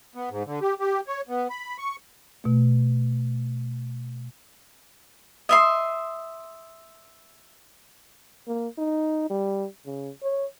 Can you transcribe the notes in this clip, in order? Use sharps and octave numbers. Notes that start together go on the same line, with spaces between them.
B3
G#2
D3
G4
G4
C#5
B3
B5
C#6
B2 A3
D#5 E5 C6
A#3
D#4
G3
C#3
C#5